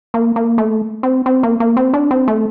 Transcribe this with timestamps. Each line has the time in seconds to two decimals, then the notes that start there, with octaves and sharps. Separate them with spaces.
0.14 A#3
0.36 A#3
0.58 A3
1.03 C4
1.26 C4
1.43 A#3
1.60 A#3
1.77 C4
1.94 D4
2.11 C4
2.28 A3